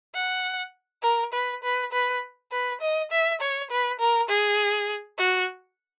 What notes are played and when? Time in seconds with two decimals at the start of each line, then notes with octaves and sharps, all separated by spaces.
0.15 F#5
1.03 A#4
1.33 B4
1.63 B4
1.92 B4
2.52 B4
2.81 D#5
3.11 E5
3.41 C#5
3.71 B4
4.00 A#4
4.29 G#4
5.19 F#4